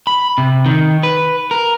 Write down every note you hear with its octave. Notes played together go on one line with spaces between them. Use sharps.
B5
C3
D#3
B4
A#4